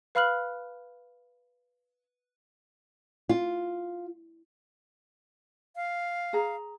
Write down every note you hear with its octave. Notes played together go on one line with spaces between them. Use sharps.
B4 F5 B5 F6 F#6 F#7
F4
F5
G#4 A#5